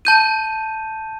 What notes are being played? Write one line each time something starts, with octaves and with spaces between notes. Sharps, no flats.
A5 G6 D#7